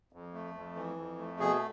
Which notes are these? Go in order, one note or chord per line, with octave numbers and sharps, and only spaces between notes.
F2
A3
F2
E3
F2
A3
B2 G#4